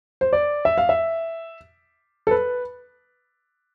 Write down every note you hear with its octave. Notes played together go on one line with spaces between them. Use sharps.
C5
D5
E5
F5
E5
A4
B4